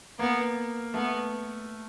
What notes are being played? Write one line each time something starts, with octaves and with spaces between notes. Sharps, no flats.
A#3 B3
A3 B3